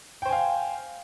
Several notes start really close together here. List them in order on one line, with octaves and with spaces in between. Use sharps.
G5 C5 G#5 F5